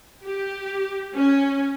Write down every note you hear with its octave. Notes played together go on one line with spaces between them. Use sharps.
G4
C#4